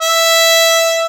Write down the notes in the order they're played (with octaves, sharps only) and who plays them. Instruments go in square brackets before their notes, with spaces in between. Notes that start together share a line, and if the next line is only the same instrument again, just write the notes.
[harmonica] E5